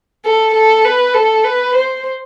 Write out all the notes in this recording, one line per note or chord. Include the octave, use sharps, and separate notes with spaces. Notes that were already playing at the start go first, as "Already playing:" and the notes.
A4
A4
B4
A4
B4
C5